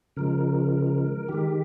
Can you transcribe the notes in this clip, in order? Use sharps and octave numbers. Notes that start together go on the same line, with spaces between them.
C#3 F3 G#3 A#4
D#3 G#3 G4